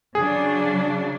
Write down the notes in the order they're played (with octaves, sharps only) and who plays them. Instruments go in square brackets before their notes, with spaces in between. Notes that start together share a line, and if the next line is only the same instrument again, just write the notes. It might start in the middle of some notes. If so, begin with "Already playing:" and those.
[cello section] C#3 F#3 D4 [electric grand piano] G#4